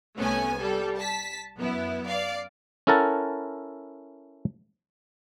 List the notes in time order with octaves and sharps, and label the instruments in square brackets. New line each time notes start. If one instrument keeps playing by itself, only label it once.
[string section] C2 A3 B3 C#4 G#5
G3 A4
A5 B6
F#2 B3 E4
D5 F5
[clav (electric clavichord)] C#4 E4 A4 A#4 F#5 A5